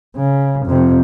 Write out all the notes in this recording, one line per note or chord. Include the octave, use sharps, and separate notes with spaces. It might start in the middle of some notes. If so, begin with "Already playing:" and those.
C#3
F2 C3